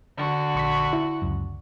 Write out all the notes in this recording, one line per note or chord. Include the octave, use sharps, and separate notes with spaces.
D3 F#4
A#1 C#6 B6
E4
C#2 F#2